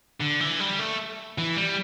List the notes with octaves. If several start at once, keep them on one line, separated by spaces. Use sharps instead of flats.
D3
E3
G3
A3
E3
G3